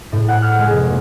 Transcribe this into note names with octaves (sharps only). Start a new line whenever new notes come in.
A2
F#5
F6
G#3
F1
A#2